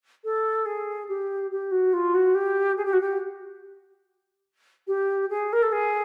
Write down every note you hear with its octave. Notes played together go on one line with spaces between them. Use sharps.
A4
G#4
G4
G4
F#4
F4
F#4
G4
G#4
G4
F#4
G4
G4
G#4
A#4
A4
G#4